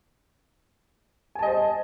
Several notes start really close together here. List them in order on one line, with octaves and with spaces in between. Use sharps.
G#5 A5 D#5 C5